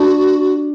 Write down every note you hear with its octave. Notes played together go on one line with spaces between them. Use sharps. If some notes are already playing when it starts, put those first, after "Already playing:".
Already playing: D4 F#4